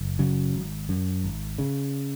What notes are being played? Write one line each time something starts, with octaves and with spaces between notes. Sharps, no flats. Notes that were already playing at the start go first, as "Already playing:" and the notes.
Already playing: F#1
C#3 F#3
G#1
F#2
G#1
C#3